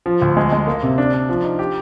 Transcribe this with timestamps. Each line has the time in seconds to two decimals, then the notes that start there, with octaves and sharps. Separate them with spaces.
0.06 F3
0.22 D2
0.37 G#3
0.52 G#3
0.67 A#3
0.83 C3
0.98 D4
1.13 D4
1.29 F3
1.43 D#4
1.59 G4